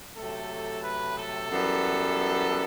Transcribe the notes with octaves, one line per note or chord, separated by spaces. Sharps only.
C3 F#3 A3 A4
B4
A4
F#2 E3 G3 B3